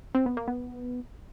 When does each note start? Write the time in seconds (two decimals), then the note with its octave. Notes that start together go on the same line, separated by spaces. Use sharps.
0.15 C4
0.26 B3
0.37 A#3
0.48 B3